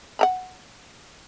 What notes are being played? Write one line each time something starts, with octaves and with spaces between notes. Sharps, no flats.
F#5 A#5 B5